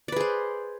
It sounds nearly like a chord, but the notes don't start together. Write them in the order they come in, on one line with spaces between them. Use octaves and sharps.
D5 B4 G#4 C5